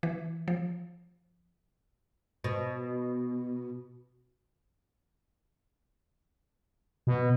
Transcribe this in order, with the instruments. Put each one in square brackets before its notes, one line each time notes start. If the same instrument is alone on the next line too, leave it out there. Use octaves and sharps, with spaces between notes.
[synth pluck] E3
F3
[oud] B2
[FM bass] B2